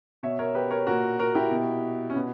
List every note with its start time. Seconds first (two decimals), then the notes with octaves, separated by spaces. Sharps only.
0.23 B2 C#5 E5
0.39 A#4 C#5
0.55 G4 B4
0.71 A#4 C#5
0.87 A#2 F#4 A#4
1.19 F#4 A#4
1.35 E4 G4
1.51 B2
2.10 C#4
2.15 B2 B3